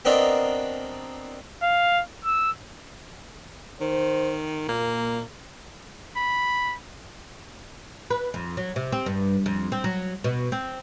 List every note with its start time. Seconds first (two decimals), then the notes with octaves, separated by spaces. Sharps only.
0.05 B3 C4 D4 F#4 A#4 D#5
1.63 F5
2.25 E6
3.80 D#3 C5
4.68 A#2 A#3
6.16 B5
8.10 B4
8.34 F2
8.57 F#3
8.76 C3
8.92 C4
9.06 G2
9.46 F2
9.72 C4
9.84 F#3
10.24 B2
10.52 C4